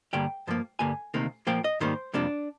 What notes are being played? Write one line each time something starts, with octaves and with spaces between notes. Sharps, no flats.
G2 D3 G3 A#3 G5
G2 F3 A#3
G2 D3 G3 A#3 G#5
D2 C3 D#3 A#3
A#2 F3 A#3 G5
D#5
G#2 D#3 G3 A#3 C5
F2 C3 G3 A#3 D4